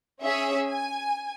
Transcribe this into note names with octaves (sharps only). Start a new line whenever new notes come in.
C#4 G#4 E5
G#5